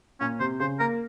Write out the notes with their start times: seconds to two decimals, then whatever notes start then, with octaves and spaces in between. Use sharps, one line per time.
0.21 A#2 C#4
0.40 C3 C5
0.60 C#3 C5
0.80 A#3 A#4